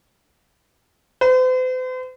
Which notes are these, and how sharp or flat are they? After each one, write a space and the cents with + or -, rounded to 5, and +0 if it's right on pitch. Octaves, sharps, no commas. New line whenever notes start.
C5 -45